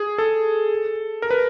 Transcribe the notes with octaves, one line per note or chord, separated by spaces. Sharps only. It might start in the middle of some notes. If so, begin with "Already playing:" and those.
Already playing: G#4
A4
A#4
B4